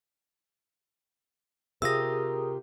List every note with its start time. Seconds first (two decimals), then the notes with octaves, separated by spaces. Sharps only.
1.82 C3 F4 G4 G#4 A#4 D#6 E6 A#6